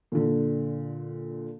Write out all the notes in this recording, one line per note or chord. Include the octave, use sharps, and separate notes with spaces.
A#2 D3